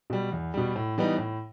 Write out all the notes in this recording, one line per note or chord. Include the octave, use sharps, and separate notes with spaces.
B2 G3
E2
B2 G3
A2
E3 G3 B3 D#4
A2